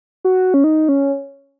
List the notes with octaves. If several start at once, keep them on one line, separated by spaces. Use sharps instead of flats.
F#4
C#4
D#4
C#4